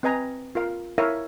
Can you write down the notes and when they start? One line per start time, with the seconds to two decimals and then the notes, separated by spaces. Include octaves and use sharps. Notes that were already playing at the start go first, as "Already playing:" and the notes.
0.03 C4 B4 D#5 G#5 A#5
0.55 F4 A#4 F5
0.98 E4 A#4 C#5 E5 F5